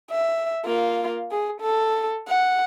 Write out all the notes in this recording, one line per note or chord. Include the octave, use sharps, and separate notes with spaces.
E5
A#3 F4
G#4
A4
F#5